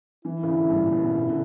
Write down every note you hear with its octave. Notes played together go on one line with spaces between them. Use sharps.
E3 E4
C#3
D3
G2
A#2
B2
B2
C#3
D3